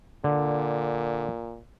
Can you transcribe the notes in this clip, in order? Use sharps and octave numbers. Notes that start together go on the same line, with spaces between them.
A#2 D3